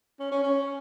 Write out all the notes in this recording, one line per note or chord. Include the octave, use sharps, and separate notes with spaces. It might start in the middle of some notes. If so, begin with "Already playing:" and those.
C#4
C#4
C#4